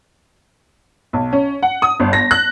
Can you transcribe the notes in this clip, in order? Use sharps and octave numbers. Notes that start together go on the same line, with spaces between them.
B1
C#4
F#5
D#6
G1
A#6
F#6